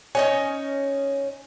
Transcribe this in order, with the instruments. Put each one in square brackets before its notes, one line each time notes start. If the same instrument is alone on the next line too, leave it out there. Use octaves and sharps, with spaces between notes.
[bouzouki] C#4 D#4 C#5 [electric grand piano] G#5